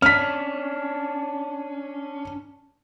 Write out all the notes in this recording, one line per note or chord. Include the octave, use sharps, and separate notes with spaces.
C#4 D4 F6 B6